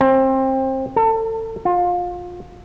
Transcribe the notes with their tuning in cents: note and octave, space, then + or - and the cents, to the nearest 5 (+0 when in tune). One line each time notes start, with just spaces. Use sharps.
C4 +25
A4 +30
F4 +25